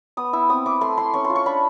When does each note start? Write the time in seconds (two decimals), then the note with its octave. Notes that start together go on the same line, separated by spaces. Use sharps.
0.17 B3 D#6
0.33 E4 E6
0.49 C4 D#6
0.66 E4 D6
0.81 A3 C6
0.97 E4 C6
1.14 C#4 C#6
1.25 C6
1.30 F4
1.35 C#6
1.46 D4 B5